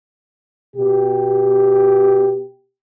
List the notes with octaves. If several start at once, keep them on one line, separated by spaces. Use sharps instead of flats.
B2 G4